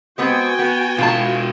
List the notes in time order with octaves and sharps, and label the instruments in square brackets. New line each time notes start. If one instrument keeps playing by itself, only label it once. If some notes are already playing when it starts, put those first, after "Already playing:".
[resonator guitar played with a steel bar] G#3 B3 C4 [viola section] F#4 G5 G#5
[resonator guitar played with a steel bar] B3
[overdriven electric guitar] B2 E3 [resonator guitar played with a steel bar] F4 A5